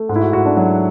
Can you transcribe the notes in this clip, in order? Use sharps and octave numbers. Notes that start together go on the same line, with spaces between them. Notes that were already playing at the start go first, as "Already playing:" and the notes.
Already playing: A3
G#2
E4
F#4
G#2 F#4
D4
F#3